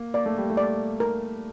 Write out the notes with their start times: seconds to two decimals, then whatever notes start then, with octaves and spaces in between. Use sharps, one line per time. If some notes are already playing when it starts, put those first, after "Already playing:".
Already playing: A#3
0.14 A#3 D5
0.26 A3
0.38 G3
0.50 A3
0.57 D5
1.00 A#4